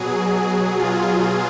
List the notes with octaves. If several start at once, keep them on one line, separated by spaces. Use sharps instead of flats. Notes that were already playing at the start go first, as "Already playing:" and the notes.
Already playing: B2 F#3 G#4
F4